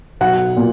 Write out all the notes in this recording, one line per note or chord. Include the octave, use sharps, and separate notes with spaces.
B1 F#5
A#2